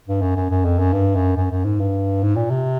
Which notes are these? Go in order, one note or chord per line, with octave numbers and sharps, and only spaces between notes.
G2
F#2
F#2
F#2
F2
F#2
G2
F#2
F#2
F#2
G#2
G2
G#2
A#2
C3